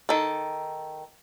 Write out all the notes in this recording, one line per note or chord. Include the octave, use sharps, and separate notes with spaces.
D#3 A4